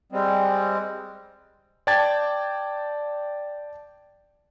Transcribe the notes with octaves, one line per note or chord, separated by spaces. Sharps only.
G3 G#3 C4
D5 G5 A5 D6 G#6 A6